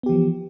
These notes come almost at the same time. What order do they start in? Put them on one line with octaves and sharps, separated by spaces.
B3 G4 E3 F3